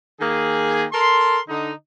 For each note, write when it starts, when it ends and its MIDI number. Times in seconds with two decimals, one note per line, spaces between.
0.21 0.85 51
0.21 0.85 58
0.21 0.85 68
0.92 1.39 69
0.92 1.39 70
0.92 1.39 84
1.49 1.72 50
1.49 1.72 63